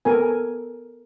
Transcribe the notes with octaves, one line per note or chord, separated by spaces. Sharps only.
B3 A4 A#4 G#5